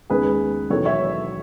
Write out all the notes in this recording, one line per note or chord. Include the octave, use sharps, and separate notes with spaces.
D#2 C#3 G#3 B3 G#4 B4
E1 E2 D#3 F#3 B3 A4 C#5
C#5 E5